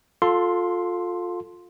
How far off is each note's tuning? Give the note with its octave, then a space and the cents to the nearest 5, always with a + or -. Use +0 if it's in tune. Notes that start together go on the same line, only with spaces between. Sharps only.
F4 +20 A4 +0 C6 +0